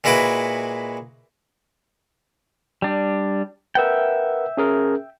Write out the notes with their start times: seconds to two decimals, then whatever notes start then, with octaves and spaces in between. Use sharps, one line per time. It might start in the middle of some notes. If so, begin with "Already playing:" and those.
0.04 A#2 G#3 E4 F#4 B4 D6
2.82 G3 D4
3.75 A#4 B4 E5 F#5 G5
4.57 C#4 G#4 A#4